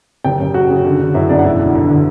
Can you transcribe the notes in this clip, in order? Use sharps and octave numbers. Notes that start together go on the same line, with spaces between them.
F#1 G4 G5
F#2
C#3 F#4 F#5
C#3
D3
D3
F#2 E4 E5
G1 D4 D5
F#5
E1 E4 E5
D3
D3
D3